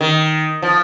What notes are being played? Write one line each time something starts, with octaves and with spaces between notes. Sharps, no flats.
D#3
F3